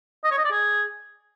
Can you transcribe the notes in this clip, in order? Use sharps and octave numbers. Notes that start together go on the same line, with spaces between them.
D#5
C#5
D#5
D5
G#4